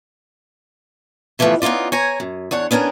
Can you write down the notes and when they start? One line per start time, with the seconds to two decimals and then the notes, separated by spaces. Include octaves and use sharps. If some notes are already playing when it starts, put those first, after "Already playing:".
1.39 C3 E3 F3 G3 A3 B3
1.62 B3 C#4 D#4 F4 D5
1.92 C#5 G#5 A#5
2.20 F#2
2.51 E2 D4 C#5 F#5
2.71 B3 C#4 D4 A#4 G#5